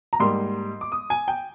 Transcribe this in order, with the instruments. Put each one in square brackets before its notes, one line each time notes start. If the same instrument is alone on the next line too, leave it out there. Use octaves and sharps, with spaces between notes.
[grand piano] A#5
G#2 G3 A#3 C6
D6
D#6
G#5
G5